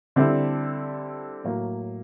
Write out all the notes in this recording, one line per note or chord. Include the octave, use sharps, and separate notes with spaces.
D3 G3 C4 E4 A4
A2 F#3 A#3